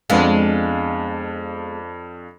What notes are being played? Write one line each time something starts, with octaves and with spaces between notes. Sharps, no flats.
F2 G#3 B3 D4 F5